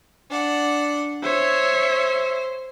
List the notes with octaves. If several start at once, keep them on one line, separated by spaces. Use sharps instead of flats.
D4 F#5
C5 C#5 E5